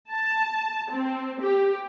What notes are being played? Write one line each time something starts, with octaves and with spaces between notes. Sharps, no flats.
A5
C4
G4